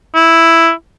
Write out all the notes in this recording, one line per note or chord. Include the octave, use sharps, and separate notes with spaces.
E4